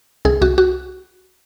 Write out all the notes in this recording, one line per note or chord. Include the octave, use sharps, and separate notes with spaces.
C2 G#4
C2 F#4
F#4